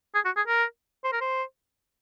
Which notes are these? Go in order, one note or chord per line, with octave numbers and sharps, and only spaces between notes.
G#4
F#4
G#4
A#4
C5
A#4
C5